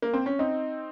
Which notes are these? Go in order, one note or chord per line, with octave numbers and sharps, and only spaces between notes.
A#3
C4
C#4
C4 D#4